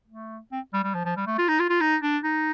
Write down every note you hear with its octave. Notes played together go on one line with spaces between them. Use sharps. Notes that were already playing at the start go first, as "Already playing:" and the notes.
A3
C4
G3
G3
F3
F3
G3
A3
F4
D#4
F4
F4
D#4
D4
D#4